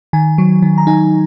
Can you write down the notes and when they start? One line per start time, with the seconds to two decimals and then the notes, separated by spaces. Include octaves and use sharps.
0.13 D#3 G#5
0.38 F#3
0.62 D#3
0.78 A#5
0.87 D#4 G#5